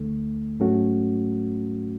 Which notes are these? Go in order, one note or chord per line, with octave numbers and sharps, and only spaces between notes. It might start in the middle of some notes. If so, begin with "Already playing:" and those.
Already playing: D2 D3 A3
G#2 F#3 A3 C#4 F#4